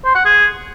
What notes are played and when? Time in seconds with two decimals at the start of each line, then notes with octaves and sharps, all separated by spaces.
0.05 C5
0.15 F#5
0.25 G#4